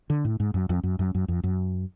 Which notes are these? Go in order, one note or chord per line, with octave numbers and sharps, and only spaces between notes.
D3
A2
G#2
F#2
F2
F#2
F#2
F#2
F2
F#2